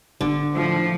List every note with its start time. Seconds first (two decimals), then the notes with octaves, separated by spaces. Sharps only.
0.21 G1 D3
0.54 A2 F3